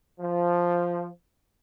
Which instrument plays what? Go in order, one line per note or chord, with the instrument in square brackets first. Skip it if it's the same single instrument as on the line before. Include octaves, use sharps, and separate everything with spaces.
[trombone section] F3